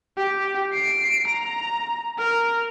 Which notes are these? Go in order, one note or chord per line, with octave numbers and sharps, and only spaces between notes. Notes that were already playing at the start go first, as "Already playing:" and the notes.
G4
C7 D7
A#5
A#4